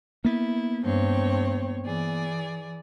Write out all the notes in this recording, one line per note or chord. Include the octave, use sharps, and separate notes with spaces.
A#3 B3 E4
G2 C4 C#5
E3 G#4 D5